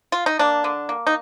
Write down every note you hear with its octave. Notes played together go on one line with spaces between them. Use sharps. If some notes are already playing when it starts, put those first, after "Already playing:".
F4
D#4
A#3 D4
D3
A#3
D#4